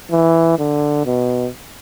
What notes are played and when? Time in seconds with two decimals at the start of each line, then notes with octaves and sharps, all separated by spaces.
0.11 E3
0.59 D3
1.06 B2